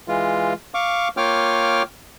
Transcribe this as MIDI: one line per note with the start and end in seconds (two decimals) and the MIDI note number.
0.08 0.53 52
0.08 0.53 56
0.08 0.53 65
0.74 1.08 77
0.74 1.08 85
0.74 1.08 86
1.17 1.82 58
1.17 1.82 65
1.17 1.82 73
1.17 1.82 79
1.17 1.82 86
1.17 1.82 89